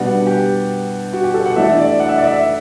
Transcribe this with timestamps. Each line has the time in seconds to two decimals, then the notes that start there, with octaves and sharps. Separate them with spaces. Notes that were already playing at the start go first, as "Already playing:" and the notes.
Already playing: B2 G3 B3 D4 F#5
0.27 G4
1.13 F#4
1.24 G4
1.34 A4
1.46 F#5
1.56 E3 A3 D4 E5
1.78 D5
2.00 F#5
2.09 E5
2.18 D5
2.27 E5